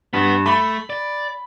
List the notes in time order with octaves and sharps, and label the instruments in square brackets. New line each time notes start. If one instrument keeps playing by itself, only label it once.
[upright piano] G2 [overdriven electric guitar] B3
[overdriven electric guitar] A3 [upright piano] B5
[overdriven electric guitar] D5